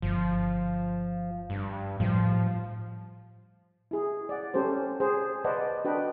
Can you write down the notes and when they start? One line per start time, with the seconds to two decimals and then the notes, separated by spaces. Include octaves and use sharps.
0.02 G1 F3
1.50 G2
2.00 A2 F3 G3
3.91 E4 G#4
4.29 D5 F#5
4.54 C#4 G4 A4 C5
5.00 G#4 C5
5.44 B4 C5 D5 D#5 F#5 A5
5.85 D4 F#4 B4 D#5 G5